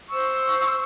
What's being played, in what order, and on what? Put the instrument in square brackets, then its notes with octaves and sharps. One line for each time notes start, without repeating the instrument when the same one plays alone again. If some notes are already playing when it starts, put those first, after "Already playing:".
[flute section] C5 C#6 E6